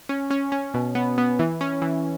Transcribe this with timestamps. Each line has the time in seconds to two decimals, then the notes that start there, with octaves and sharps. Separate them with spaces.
0.09 C#4
0.30 C#4
0.52 C#4
0.74 B2
0.95 B3
1.18 B3
1.39 E3
1.61 C#4
1.82 E3